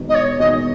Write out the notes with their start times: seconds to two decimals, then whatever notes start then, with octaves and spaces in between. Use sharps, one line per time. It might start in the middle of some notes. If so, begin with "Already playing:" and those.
Already playing: E1 E2 D#3
0.09 D#5
0.15 C#5
0.39 E1 E2 D#3 D#5